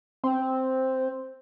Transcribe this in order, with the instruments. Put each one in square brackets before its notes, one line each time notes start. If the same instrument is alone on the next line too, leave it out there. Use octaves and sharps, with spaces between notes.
[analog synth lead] C4